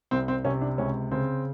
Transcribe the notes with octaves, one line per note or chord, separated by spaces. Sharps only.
C2 C4
C4
C3 C#4
D4
C#2 C#4
C#3 C4